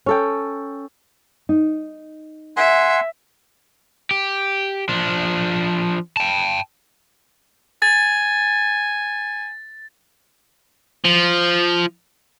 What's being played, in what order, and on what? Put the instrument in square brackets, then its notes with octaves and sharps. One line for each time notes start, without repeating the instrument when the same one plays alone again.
[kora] C#4 A4 G5
[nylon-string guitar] D#4
[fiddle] E5 [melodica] F#5 G#5 C6
[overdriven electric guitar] G4
F3 D4
G5 A5
[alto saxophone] G#5 [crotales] A6
[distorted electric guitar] F3